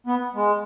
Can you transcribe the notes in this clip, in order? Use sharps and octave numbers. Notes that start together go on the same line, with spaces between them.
B3
G#3